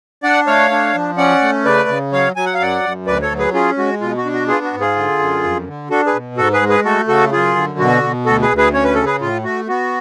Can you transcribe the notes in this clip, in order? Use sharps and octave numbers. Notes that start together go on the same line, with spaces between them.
D4 D5 F#5
A3 C#5 F5
D4
F3
C#4 D5 F#5
A3
C#3 B4 D5
C#3
F#3 C#5 F5
F#3 G#5
F#5
F5
F#2 D5 F#5
F#2
D2 B4 D5
A4 C#5
F#3
G#4 B4
C#4 F4 G#4
G#3 F#4
B2 F4
F#4
D4
F#4
B3 F4 G#4
F#4
G#2
F4 G#4
D3
F#2
F2
D3
D4 F#4 A4
G#4 B4
B2
G#2 F#4 A4
G#4 B4
G#3
G#4 B4
A3 F#4 A4
C#3 F#4 A4
F#2 F4 G#4
D3
B2 F#4
B2
D2 F#4 A4
G#4 B4
D2
G#4 B4
C#4 C#5
B4
C#3 A4
G#4 B4
A2 F4
A3 F#4
B3 F#4